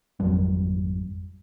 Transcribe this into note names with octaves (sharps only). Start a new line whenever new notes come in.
G#1 F2 F#3 G3